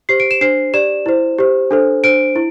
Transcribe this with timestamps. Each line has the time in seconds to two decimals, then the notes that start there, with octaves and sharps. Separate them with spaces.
0.09 G4 C5 C7
0.20 D7
0.31 E7
0.41 D4 C5 C7
0.74 G4 D5 E7
1.06 E4 C5
1.38 G4 C5
1.71 D4 A4 C5
2.03 D4 C5 D7
2.36 E4